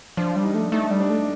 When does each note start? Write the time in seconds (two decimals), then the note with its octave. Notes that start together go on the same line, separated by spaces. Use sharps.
0.17 F3 D4
0.36 G3
0.45 D#4
0.54 A3
0.72 A3 D#4
0.91 G3
1.00 D4
1.10 A3